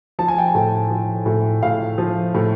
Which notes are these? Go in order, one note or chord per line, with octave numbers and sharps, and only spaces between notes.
F3 A5
G#5
G5
G#5
A2
F3
A2
A2 F5
F3
A2